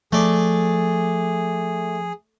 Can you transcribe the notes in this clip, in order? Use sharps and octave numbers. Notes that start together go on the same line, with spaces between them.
F3 A3 G#4 D5